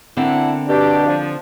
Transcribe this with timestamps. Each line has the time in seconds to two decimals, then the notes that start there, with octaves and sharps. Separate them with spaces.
0.17 D3 A#3 C4 D4 E4 F#5
0.69 B2 D4 G4
1.07 F3